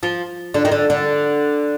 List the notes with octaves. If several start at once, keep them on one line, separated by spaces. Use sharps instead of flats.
F3
D3
D#3
D3
D3